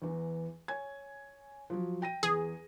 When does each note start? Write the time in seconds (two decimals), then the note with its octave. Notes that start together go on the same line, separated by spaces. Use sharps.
0.02 E2 E3
0.68 C#5 G#5 G#6
1.70 F3 F#3
2.02 G5 A#6 D#7
2.23 E2 G#4